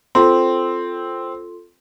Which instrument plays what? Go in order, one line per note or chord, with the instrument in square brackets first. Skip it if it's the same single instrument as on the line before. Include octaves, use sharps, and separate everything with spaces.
[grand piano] C4 [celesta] F4 A4 C6